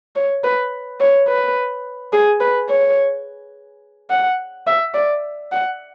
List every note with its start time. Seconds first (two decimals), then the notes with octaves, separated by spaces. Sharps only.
0.16 C#5
0.43 B4
1.00 C#5
1.28 B4
2.13 G#4
2.40 B4
2.69 C#5
4.10 F#5
4.67 E5
4.94 D5
5.51 F#5